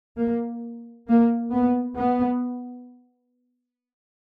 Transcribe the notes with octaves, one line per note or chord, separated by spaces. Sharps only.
A#3
A#3
B3
B3